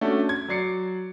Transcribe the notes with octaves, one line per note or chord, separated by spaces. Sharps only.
A3 C#4 D4 F#4
G#6
F#3 D5 C7 C#7